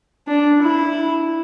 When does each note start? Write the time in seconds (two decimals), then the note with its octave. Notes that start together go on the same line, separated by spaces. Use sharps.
0.27 D4
0.61 E4